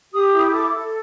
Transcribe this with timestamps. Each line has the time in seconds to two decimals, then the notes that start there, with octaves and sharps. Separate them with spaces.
0.13 G4 D#6
0.33 E4
0.38 D#6
0.52 A4 D6
0.72 A4